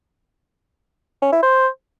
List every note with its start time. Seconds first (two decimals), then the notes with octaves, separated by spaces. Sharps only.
1.22 C#4
1.32 E4
1.43 C5